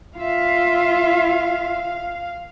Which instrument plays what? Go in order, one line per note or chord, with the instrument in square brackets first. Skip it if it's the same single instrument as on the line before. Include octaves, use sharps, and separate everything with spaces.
[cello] F4 E5 [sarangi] F5